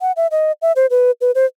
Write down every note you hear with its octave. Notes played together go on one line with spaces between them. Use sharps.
F#5
E5
D#5
E5
C5
B4
B4
C5